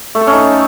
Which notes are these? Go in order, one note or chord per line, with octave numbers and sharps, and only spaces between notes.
A3
A4
C#4
D#4